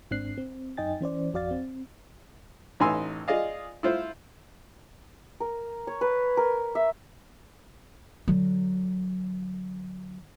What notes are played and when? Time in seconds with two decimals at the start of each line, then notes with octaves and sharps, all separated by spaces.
0.11 G#1 G#2 C4 D4 F#6 C7
0.38 C4
0.77 F#2 D#4 D#5 G5 G#5 A6
1.01 E3 C#4 C5 D5
1.33 G#1 F2 F#4 D5 F5 A6
1.51 C4
2.80 A1 D#4 B4 G#5 C6 E6
3.28 F4 G#4 D5 D#5 F5
3.83 E4 F4 C5
5.40 A#4
5.87 C#5
6.01 B4
6.37 A#4
6.75 E5
8.28 D3 F#3